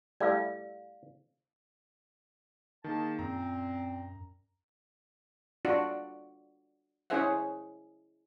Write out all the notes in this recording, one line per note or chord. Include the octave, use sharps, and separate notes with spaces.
G3 A3 E4 D5 F5
D#3 A#3 G#4 A5
F#2 A#2 C4 A#5
D4 F4 F#4 D5
C#4 E4 G#4 C5 E5 F#5